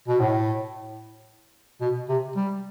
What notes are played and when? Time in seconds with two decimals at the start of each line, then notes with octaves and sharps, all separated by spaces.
0.08 B2
0.19 A2
1.81 B2
2.09 C3
2.36 G3